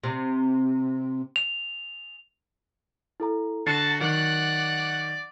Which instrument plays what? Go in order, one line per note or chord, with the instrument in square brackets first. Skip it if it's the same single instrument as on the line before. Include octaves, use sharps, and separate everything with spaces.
[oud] C3
[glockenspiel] F7
[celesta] E4 A4 A#5
[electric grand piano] D3 [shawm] F#4 [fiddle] A5 [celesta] A6 C7 C#7
[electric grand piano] D#3 F#3 [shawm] D5 [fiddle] F#5 F#6